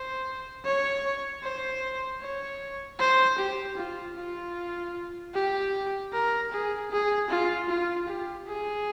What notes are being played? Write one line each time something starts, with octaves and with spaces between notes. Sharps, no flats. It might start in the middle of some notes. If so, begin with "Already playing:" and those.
Already playing: C5
C#5
C5
C#5
C5
G4
F4
F4
G4
A#4
G#4
G#4
F4
F4
G4
G#4